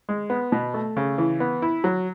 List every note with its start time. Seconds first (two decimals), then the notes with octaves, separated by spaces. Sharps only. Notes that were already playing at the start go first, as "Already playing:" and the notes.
0.09 G#3
0.30 B3
0.52 B2
0.74 A3
0.97 C#3
1.18 E3
1.40 B3
1.62 E4
1.84 F#3